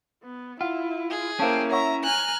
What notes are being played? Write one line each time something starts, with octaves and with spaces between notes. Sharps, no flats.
B3
E4 F4 F#5
G#4
A#3 C#4 E4 C5 F5 G5 A5
C#5 E5 F#5 A#5 C#6
G#5 A#5 F6 F#6